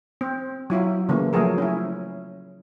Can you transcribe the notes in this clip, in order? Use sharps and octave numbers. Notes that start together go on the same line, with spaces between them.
C4
F#3 E4 F4
C#3 E3 A3 A#3
F3 F#3 A3 G#4 A#4
C#4 E4